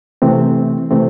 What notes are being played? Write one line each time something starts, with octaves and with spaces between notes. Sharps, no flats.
C3 E3 A3 C4
C3 E3 A3 C4